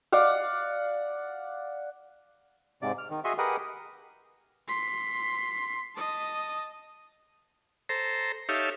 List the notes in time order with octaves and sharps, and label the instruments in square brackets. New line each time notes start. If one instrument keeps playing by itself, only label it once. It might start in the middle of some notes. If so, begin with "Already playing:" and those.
[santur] D5 F5 F#5
[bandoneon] G#2 C3 D5
F6
D#3
F#4 G#4 D#5 E5 C6 C#6
G4 G#4 A#4 B4 D#5 F#5
[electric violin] C6 B6
D#5 A5
[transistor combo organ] A4 C5 A#5
D#4 G4 A4 C#5 E5 F5